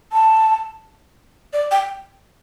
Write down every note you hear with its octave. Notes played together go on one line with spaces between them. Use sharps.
A5
D5
G5